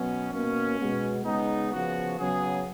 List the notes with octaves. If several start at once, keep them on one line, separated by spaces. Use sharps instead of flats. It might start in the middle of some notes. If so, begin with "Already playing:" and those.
Already playing: B2 F#3 B3 C#4
B2 A#3 C#4
B2 G#3 B3
C#3 G#3 B3 D#4
C#3 F3 B3 F#4
C#3 F#3 B3 G#4